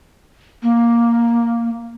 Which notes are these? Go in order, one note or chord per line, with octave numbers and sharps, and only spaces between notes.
A#3